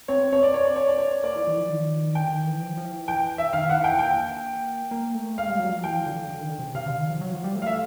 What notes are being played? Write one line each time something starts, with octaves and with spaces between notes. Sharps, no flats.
C4 C#5
C4 C#5
D5
C#5
D5
C#5
D5
C#5
A#3 D5
E3
D#3
E3
F3
D#3
G5
D3
D#3
E3
F3
F3
E3
G5
E5
D#3 F5
F#5
E3
G5
A#3 G5
A#3
A3
G#3 F5
G3
F#3
F3
E3 G5
D3
D3
D#3
D3
C3
C#3
C3 F5
D3
D#3
F3
F#3
F3
G3
A3
F5
E5